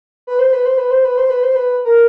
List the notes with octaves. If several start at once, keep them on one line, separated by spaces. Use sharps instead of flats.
B4
C5
B4
C5
B4
C5
B4
C5
B4
C5
B4
A#4